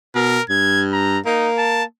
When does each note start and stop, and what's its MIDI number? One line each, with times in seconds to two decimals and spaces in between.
0.15 0.39 47
0.15 0.42 70
0.50 1.19 43
0.50 0.85 92
0.93 1.19 82
1.26 1.84 58
1.26 1.49 63
1.58 1.84 81